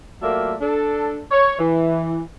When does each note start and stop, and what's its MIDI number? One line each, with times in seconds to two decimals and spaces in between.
0.22 0.54 54
0.22 0.54 57
0.22 0.54 58
0.22 0.54 62
0.22 0.54 65
0.22 0.54 76
0.61 1.22 62
0.61 1.22 69
1.32 1.56 73
1.59 2.21 52